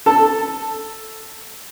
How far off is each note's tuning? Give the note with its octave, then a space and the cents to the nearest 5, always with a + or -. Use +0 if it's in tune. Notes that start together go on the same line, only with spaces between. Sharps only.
A4 +0 A5 +10